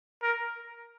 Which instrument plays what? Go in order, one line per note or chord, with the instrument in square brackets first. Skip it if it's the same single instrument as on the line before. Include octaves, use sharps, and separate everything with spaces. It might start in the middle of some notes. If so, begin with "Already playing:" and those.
[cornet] A#4